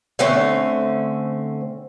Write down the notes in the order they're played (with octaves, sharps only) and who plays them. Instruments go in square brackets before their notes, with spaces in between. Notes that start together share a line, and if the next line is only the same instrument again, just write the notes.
[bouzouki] D3 A3 C4 C#4